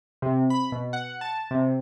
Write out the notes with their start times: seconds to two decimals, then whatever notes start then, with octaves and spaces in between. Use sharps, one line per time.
0.22 C3
0.50 B5
0.72 B2
0.93 F#5
1.21 A5
1.51 C3